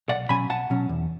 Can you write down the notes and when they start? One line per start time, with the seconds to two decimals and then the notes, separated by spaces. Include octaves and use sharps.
0.09 B1 D5 F#5
0.29 B2 F#3 C#4 G#5 B5
0.49 B1 F#5 A5
0.70 B2 F#3 C#4
0.89 E2